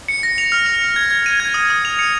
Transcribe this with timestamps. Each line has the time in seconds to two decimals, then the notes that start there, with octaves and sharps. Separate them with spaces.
0.08 C#7
0.23 A#6
0.38 F7
0.52 F6
0.66 F7
0.82 C#7
0.96 G#6
1.11 G#6
1.26 D#7
1.40 G#6
1.54 D#6
1.70 D#6
1.85 F7
1.99 C#7